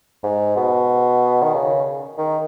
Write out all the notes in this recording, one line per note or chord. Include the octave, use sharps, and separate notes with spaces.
G#2
B2
D#3
C#3
D#3